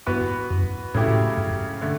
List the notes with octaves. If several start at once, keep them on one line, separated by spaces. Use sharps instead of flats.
G2 E3 B3 F#4 B4
F#2
A2 C#3 F#3 A3 E4 G4
G2
D3 A3